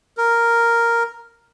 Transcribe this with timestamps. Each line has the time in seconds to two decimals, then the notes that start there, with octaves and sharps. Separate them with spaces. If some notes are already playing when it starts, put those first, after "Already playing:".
0.17 A#4